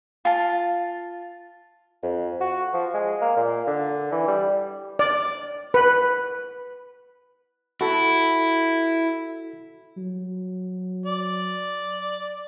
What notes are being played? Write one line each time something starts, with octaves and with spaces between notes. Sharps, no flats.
F4 A5
F2
F#4
F3
G#3
A#3
A#2
D3
E3
G3
D5
B4
E4 F#4 A4
F#3
D5